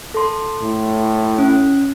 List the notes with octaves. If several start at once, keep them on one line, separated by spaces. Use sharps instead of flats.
A4 C6
A2
C#4